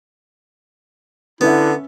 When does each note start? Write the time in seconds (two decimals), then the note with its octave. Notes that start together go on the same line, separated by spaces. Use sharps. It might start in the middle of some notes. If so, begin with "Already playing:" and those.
1.41 D3 B3 C#4 E4 E5